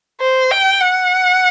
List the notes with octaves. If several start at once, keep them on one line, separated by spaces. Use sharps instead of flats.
C5
G5
F#5